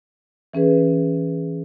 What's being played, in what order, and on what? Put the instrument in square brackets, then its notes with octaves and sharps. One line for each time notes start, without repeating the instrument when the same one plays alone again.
[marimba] E3 C#4 G#4 B4